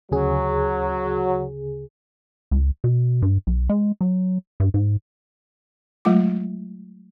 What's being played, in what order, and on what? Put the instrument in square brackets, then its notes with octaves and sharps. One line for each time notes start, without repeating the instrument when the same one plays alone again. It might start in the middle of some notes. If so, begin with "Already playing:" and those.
[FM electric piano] D2 C#3 G#4 [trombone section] F#3
[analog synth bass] C#2
B2
G2
B1
G#3
F#3
G2
G#2
[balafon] F#3 G#3 A3 F4 D6